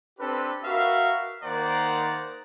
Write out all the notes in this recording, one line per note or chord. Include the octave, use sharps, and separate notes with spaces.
C4 D4 G4 A4 B4
F#4 A#4 B4 E5 F5
D#3 A#3 C5 D5 F#5 A#5